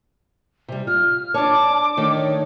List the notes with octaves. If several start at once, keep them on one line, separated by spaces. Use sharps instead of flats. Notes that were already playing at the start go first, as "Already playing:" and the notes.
C3 G3
F4 F6
D4 C#5 A5 D6
D#3 A3 D4 C#5